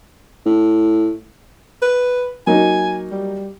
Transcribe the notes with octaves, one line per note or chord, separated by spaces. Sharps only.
A2
B4
F#3 A#3 D#4 G#5
G3